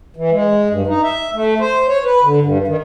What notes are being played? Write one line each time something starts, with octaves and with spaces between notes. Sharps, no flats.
E3
G#3
G2
D#4
E5
A3
C5
C#5
B4
D3
G2
D#3